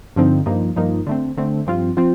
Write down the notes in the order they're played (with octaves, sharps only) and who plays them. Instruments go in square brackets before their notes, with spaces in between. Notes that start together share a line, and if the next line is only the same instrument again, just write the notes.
[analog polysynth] G2 D3 F3 C4 D#4
G2 F3 A#3 D#4
G2 F3 A#3 D#4
D3 A3 C4
D3 A3 C4
G2 F3 C4 F4
F3 C4 F4